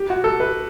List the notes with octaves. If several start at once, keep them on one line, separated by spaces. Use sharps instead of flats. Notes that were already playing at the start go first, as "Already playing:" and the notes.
Already playing: G4
F#4
A4
B4